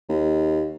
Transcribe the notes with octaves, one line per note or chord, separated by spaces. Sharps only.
D#2